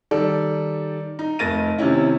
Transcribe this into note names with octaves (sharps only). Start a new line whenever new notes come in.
D#3 G3 A4 D5
D#4
F1 A#4 A6 A#6 D#7
C3 D#3 C#4 E4